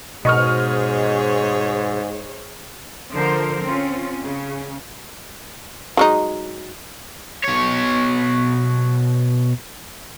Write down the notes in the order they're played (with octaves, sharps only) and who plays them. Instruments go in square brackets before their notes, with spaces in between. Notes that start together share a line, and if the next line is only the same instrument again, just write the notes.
[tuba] G#2 [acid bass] B2 [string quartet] G#4 C5 C#5 [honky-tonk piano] D#5 C#6 F6
[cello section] D3 F3 A#4 C5
C4 C#4 F4
C#3 C#4
[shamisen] F#3 G#3 D#4
[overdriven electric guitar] B2 C#5